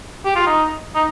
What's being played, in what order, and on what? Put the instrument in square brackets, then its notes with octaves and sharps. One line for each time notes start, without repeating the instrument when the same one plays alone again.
[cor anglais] G4
F4
D#4
D#4